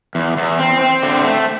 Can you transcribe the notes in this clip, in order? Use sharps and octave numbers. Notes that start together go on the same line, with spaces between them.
E2
E2
C4
C4
D3
A3